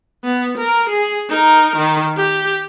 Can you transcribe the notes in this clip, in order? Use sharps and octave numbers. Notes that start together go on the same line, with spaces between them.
B3
A#4
G#4
D#4 A#4
D#3
G4